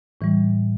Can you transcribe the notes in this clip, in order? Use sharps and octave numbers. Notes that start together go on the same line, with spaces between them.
A2 E3 G3